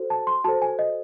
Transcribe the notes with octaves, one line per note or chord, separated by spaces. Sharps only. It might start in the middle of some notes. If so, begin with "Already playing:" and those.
Already playing: F#4 A4 C5
A5
C6
F#4 A4 C5 A5
G#5
D#5